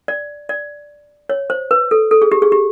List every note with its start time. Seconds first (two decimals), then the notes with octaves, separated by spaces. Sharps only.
0.08 D5
0.49 D5
1.29 C#5
1.50 C5
1.71 B4
1.91 A4
2.11 A4
2.22 G#4
2.32 G4
2.42 G#4
2.52 G4